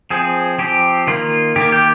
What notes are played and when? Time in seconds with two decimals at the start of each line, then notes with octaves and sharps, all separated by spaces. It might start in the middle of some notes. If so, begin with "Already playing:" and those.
0.10 F3 C4 G#4
0.59 F3 C4 G4
1.07 D#3 A#3 F4
1.56 D#3 A#3 G4
1.72 G4